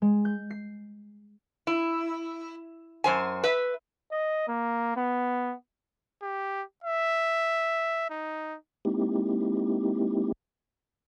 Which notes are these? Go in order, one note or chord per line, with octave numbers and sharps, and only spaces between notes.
G#3
G6
C7
E4
F#2 C5 G#5
B4 E5
D#5
A#3
B3
G4
E5
D#4
G#3 A#3 C4 D#4 E4 G4